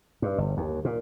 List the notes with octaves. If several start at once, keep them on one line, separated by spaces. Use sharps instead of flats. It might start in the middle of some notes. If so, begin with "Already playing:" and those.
G2
G1
D#2
A#2